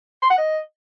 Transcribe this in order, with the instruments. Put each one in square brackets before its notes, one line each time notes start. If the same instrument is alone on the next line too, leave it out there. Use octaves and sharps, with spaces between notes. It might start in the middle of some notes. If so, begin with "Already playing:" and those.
[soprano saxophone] C6
F#5
D#5